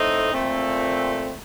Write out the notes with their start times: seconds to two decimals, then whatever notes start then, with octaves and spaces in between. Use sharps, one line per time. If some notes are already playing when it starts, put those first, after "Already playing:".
Already playing: A2 A3 C4 D#4
0.31 A#2 A3 C4